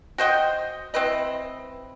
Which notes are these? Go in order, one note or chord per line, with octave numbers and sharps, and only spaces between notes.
F#4 C5 D#5 G5
C4 E4 B4 D#5